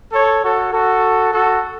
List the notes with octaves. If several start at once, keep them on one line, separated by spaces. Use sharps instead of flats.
A4 C#5
F#4 A4
F#4 A4
F#4 A4